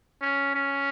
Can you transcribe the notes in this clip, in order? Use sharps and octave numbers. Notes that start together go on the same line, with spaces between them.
C#4
C#4